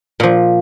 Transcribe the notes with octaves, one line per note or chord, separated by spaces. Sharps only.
A#2 F3